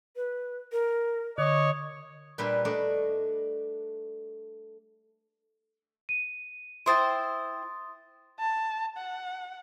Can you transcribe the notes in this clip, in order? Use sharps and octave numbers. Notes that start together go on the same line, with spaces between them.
B4
A#4
D3 C#5 D#5 D6
A#2 G3 D4 B4 E5
A3 D4 D5 D#5
D#7
E4 C5 G5 C6 D#6 A6
A5
F#5